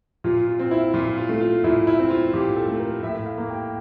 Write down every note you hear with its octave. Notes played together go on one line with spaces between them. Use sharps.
A#2 F4
F4
C4
E4
A#2 F4
F4
A3
F4
A#2 E4
E4
C4
F4
A#2 G4
A4
A3
A#4
A2 E5
F5
A#3
G5